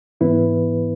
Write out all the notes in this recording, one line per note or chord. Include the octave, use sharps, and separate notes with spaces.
G#2 E3 B3 E4 B4